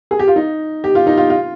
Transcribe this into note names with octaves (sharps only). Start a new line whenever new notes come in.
G#4
G4
F4
D#4
G4
F4
D#4
F4
F4